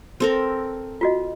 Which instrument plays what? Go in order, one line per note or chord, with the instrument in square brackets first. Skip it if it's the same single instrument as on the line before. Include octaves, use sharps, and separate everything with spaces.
[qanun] C4 A4 A#4
[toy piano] F4 F#4 D#5